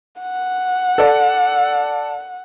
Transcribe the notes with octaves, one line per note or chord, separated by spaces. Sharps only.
F#5
A4 D5